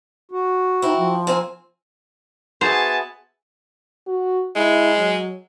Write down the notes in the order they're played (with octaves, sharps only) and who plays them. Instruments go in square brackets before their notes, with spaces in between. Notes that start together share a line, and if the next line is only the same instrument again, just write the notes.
[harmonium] F#4
[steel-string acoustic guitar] C4 E4 [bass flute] D#4
[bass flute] F3
[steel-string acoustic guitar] A#3 C4 G#5
[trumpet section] B3 G#5 A5 [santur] F#4 G#4 E5 [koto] C5
[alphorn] F#4
[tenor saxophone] G#3 [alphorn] E4
[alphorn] F#3